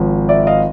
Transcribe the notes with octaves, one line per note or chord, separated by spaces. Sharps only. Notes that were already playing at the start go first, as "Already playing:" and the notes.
Already playing: G#1 G#2 F3
D5 E5
D#5 F5